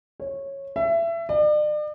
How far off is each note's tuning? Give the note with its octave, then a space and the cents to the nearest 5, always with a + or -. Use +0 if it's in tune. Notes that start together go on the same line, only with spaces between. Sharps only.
C#5 -15
E5 +25
D5 +40